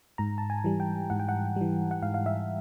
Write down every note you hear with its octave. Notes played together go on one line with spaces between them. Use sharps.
G#2 A#5
A5
G#5
E3 G3
G5
G#2 F#5
G5
F#5
E3 G3
F#5
G#2 F5
F5
E5